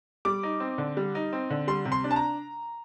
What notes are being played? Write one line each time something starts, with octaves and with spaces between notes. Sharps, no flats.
G3 D6
D#4
C4
D3
G3
D#4
C4
D3
G3 C6
C3
C6
D4
A5
A#5